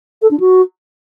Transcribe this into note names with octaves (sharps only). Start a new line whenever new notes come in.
A4
D4
F#4